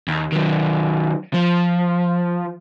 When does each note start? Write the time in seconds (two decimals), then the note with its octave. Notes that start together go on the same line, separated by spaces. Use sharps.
0.08 D#2
0.32 D#3 F#3
1.33 F3